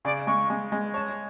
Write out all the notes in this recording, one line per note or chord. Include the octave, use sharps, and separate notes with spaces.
C#3 D5
G#3 C#6
G#3
G#3
C#5 A5